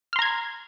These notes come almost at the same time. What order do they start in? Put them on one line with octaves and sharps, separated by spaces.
F6 C6 A#5 G#6